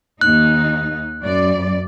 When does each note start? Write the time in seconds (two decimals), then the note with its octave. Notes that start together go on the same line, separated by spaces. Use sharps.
0.21 D#2 D#4 F#6
1.23 F#2 D5